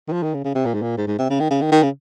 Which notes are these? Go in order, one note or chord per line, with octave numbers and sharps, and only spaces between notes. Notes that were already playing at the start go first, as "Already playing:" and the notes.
D#3
F3
D#3
C#3
C#3
C3
A#2
G#2
A#2
G#2
G#2
C3
C#3
D#3
C#3
D#3
D#3
C#3